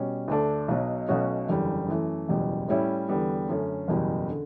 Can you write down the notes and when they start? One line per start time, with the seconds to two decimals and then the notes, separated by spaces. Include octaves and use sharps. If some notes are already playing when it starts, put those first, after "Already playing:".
Already playing: B2 G3 C#4
0.28 D2 D3 A3 D4 A4
0.68 B1 B2 F#3
1.09 B1 B2 A3 C#4 F#4
1.48 F#1 E2 D3 G3
1.88 F#2 E3 A3
2.28 F#1 E2 B2 G3
2.68 A2 G3 C#4 E4
3.09 E2 D3 G3 B3
3.49 F#2 D3 A3 C#4
3.88 F#1 E2 B2 G3
4.30 D3